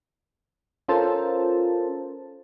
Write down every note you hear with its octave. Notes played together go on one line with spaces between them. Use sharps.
C#4 F4 A4 A#4 C5 A5